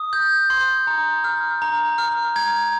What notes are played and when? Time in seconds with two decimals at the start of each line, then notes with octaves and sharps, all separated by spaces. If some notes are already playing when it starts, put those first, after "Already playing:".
Already playing: D#6
0.13 G6
0.50 C6
0.87 A#5
1.24 F6
1.62 A#5
1.98 F6
2.36 A#5 G#6